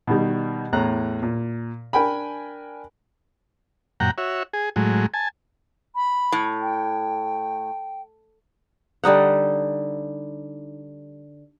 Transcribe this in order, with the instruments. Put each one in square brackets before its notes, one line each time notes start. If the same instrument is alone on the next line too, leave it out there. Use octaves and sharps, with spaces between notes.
[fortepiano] B2 D#3 G3
E2 A2 A#5 F#6
A#2
D4 A#4 G5 G#5 B5
[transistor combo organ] F#2 A#2 F#5 G5 A#5
F#4 C#5 E5
G#4
A2 F#3 G#3
G#5 A5
[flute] B5
[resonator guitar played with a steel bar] A2
[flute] G5
[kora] D3 G3 D#4 F#5